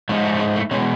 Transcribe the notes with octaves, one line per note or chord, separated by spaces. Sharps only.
G#2 F3 G#3 A3
A3
A3
G#3
A3
B2 G#3 C#4